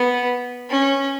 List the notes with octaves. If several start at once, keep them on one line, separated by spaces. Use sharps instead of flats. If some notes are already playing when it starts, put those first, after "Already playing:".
Already playing: B3
C#4